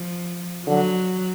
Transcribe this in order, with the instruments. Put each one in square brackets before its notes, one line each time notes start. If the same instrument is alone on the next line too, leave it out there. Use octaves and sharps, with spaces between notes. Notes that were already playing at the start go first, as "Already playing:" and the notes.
Already playing: [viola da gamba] F3
[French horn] D3 [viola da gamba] F#3